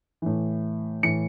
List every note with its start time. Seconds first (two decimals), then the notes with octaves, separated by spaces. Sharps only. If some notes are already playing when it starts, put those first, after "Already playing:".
0.22 A2 E3
1.03 A2 E3 C#7